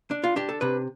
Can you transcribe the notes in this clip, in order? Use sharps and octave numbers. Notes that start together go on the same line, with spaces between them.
D4
F4
D4 G4
A4
C3 B4